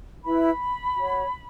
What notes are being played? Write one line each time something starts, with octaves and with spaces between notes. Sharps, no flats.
E4 B4 B5
F#4 C#5